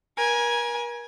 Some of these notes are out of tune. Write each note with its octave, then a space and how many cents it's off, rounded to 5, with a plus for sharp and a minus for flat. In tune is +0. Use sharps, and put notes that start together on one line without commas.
A#4 +35 G#5 +0